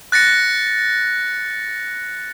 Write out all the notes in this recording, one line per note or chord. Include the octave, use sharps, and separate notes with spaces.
F#6 A6 A#6 C#7